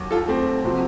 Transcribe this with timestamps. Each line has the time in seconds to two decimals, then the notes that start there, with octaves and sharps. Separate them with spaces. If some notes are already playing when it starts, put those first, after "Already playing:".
Already playing: D#2 F#3
0.11 F4 A4
0.28 A3 C4
0.64 C3 F3 C4 F#4